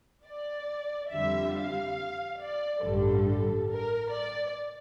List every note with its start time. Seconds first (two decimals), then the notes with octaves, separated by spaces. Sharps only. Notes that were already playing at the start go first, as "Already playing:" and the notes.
0.24 D5
1.11 F2 D3 G3 E5
1.54 F5
2.39 D5
2.83 A1 G2 D3 G3 A4
3.69 A#4
4.12 D5